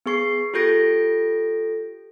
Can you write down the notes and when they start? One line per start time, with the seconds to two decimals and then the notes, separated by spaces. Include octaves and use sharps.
0.06 B3 G#4 C#6 C7
0.54 F4 G4 A4 G6 A#6 D7